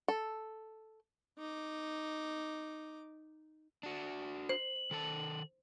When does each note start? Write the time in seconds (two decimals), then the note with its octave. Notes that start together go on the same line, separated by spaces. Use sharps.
0.08 A4
1.38 D#4 D6
3.83 D4 F#4
4.49 C5 F#7
4.91 D#3 A4 A5